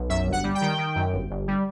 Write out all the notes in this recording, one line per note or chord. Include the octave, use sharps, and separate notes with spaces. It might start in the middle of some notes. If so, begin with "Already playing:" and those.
Already playing: B1
F#2 E5
G1
F#5
G3
G5
D#3
D#3
F#2
G1
G1
G3